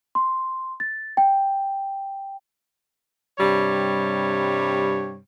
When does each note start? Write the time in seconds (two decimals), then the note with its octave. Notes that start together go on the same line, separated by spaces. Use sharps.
0.15 C6
0.80 A6
1.17 G5
3.39 G2 C3 G3 C#5